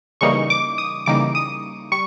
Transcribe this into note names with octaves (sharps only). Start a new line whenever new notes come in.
C#3 E3 G3 A#3 D#4 C#6
D6
D#6
C#3 E3 G3 A#3 D#4 D6
D#6
G3 C#6